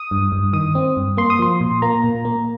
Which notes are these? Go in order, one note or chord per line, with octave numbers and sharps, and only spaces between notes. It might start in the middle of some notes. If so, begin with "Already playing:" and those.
Already playing: D#6
G2
G2
D#3 D#6
C4
G2
A#3 C6
D#6
F3 C6
A#2
A#3 A#5
A#2
A#3